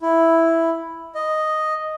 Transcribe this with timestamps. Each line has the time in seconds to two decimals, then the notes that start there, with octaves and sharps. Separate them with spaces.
0.01 E4
1.15 D#5